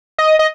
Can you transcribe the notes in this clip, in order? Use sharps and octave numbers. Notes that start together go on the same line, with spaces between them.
D#5
D#5